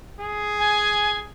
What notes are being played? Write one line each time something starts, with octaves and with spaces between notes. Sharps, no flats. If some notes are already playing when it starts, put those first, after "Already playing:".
G#4
G#5